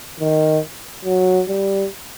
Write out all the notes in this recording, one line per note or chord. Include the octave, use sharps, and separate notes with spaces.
D#3
F#3
G3